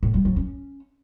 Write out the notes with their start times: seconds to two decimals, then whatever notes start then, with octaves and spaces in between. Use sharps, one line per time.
0.03 A2
0.14 G3
0.25 F#3
0.36 C#4